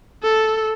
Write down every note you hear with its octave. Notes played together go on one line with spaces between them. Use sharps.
A4